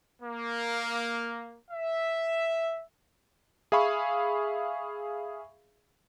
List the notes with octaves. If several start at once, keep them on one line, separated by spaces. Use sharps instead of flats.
A#3
E5
G#4 E5 F5 B5 C#6